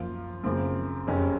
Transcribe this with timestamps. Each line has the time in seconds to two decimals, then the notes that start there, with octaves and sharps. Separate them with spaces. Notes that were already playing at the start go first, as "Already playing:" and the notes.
Already playing: F#2 F3 A#3 F4
0.43 F#2 C#3 F3 A#3 C4
1.07 F#1 F2 C3 C#4